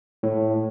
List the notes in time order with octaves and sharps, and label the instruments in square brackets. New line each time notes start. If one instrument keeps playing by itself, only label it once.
[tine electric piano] A2